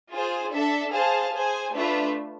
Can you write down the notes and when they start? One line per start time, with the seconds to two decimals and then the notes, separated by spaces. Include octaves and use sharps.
0.11 F4 G#4 C5
0.52 D4 A4 E5
0.93 G#4 C5 F5 A5
1.32 G#4 C5 G#5
1.73 A3 D4 F4 B4 E5